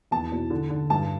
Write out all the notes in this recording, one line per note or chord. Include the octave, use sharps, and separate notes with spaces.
E2 A5
B2
D3
D3
G2 A5